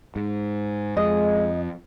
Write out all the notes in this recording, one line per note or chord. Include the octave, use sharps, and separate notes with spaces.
G#2
F2 G#3 D#5